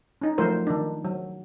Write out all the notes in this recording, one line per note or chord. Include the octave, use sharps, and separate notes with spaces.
C#4 D#4
F3 F#3 A3 F4 A#4 C5
D#3 D4
F#3